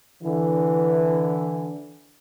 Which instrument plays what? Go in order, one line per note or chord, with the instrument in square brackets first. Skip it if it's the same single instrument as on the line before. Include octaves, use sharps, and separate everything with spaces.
[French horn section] D3 E3